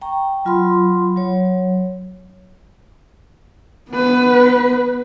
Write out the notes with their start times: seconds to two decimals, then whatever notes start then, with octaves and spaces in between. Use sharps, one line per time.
0.01 G5 A#5 C#6
0.45 F#3 F4 B5 C6
1.16 F#3 C#5
3.91 B3 B4